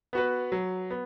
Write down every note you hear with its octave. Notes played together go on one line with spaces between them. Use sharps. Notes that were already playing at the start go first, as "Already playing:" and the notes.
B3 F#4 B4
F#3
B3